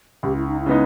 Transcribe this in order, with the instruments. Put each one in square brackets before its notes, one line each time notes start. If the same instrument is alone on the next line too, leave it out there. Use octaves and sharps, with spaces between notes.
[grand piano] C#2 [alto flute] G4
[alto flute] E4
D#4
E4
[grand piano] C#3 G#3 B3 D#4